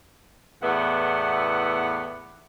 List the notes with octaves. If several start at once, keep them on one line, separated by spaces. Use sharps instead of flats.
E2 A2 B3 D5 E5 F#5